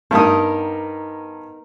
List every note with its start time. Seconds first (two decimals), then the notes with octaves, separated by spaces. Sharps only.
0.11 G2 B3 D#4 A#4 D#6